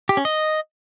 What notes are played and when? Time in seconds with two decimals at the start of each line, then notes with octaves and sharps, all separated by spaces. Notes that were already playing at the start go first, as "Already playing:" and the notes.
0.09 G4
0.17 C#4
0.25 D#5